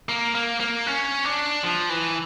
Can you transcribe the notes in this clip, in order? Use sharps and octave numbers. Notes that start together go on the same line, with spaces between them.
A#3
A#3
A#3
C#4
D4
F3
E3